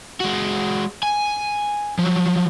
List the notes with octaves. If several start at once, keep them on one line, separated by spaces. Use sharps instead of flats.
G#3 F#4
G#5
F3 F#3